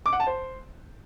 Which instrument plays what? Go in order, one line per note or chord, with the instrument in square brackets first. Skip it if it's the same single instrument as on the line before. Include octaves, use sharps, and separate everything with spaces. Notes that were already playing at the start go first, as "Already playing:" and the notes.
[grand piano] D6
F#5
A5
C5